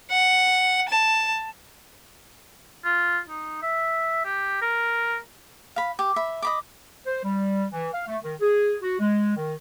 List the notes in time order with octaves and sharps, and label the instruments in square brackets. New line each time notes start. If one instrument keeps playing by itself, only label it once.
[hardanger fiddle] F#5
A5
[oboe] F4
D#4
E5
G4
A#4
[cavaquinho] F5 B5
G4
E5 B5
D#5 B5 D6
[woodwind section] C5
G3
E3
F5
A3
D#3
G#4
F#4
G#3
D#3